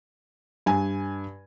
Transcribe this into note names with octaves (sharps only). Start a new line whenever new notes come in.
G2 G#5